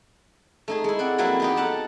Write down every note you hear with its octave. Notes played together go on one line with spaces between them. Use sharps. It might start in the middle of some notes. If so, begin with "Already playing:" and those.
A3 D#4 G#4
G#3 E4
C4 D5 F#5
F2 F#3 A#3 E4 B4
B3 D#4 G4
A4 F#5 A5 A#5